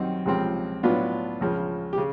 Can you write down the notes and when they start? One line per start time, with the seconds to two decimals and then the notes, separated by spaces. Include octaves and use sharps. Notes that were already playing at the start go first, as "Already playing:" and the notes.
Already playing: F#2 D#3 G3 C4 D#4
0.26 C#2 C3 F3 G#3 C4
0.83 A2 F#3 B3 D4 F4
1.41 C#2 C#3 F3
1.93 G4
1.98 C#3